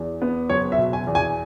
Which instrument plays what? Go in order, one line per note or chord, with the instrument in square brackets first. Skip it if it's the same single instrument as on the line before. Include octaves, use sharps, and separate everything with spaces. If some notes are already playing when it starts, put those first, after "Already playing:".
Already playing: [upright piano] E2
B3
F#1 C#5
E5
B2
G#5
E2
G#5